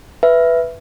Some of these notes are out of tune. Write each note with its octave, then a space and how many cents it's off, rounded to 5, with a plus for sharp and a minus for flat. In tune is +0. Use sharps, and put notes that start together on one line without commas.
B4 +0 E5 +10